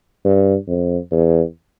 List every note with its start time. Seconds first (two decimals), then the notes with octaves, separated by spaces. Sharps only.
0.25 G2
0.67 F2
1.11 E2